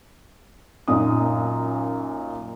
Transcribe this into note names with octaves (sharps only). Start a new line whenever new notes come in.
F#2 A#2 D#4 D#6